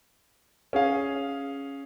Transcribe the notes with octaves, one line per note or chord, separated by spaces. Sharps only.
C#4 G#4 F5